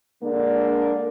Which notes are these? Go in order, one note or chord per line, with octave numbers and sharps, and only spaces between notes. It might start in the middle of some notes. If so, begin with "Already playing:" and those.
D3 G#3 A#3 D4